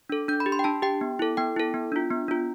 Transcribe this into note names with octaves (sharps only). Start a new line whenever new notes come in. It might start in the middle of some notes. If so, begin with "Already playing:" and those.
D4 A4
D4 G6
B5
G4
C6
G5
D4 A5
G4 G5
B3
E4 A4
B3 G5
E4 A4
B3
D4 F4
B3
D4 F4